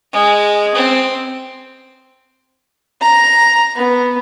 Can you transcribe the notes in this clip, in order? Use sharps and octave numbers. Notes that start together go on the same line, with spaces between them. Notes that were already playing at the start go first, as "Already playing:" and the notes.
G#3
C4
A#5
B3